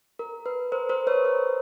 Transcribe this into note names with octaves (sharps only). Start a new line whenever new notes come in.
A#4
B4
A#4 C5
A#4 C5
B4 C#5
A#4 C5